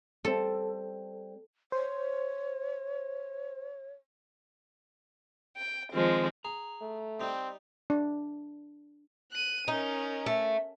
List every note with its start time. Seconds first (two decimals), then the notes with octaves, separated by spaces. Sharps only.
0.25 G3 C4 A4
1.72 C5 C#5
5.57 G5
5.93 D#3 F3 G#3 C4
6.45 G#4 A#5
6.81 A3
7.20 G3 C4 D#4
7.90 D4
9.32 F#6 D#7
9.68 C#4 D#4 A#4
10.26 A3